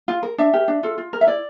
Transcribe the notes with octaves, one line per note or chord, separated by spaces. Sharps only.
F4
A#4
D4 E5
G4 A#4
D4
F4 A4
F4
A#4
E5
E4 D5